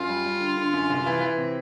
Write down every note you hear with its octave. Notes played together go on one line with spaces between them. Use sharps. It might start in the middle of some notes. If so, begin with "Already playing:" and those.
Already playing: F#2 F4
G3
G3
D3
D3
F#2
C2
E3
E3
C3